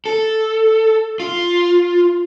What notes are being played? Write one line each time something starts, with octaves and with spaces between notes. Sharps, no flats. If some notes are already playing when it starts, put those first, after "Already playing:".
A4
F4